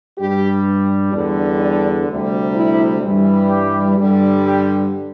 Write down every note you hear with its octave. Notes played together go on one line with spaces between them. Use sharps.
G2 G3 G4
E2 D3 G3 D4
D4
D2 C3 G3
E4
G2 E3 G3
G4
G2 D3 G3
G4